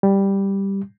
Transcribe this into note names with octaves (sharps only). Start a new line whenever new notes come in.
G3